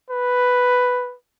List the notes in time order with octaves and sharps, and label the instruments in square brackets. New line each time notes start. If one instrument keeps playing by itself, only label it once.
[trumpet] B4